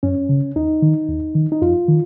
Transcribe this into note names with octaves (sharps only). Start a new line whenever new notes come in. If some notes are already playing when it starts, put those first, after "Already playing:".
F#2 C#4
C#3
D#2 D#4
D#3
D#2
D#3
D#4
F2 F4
D#3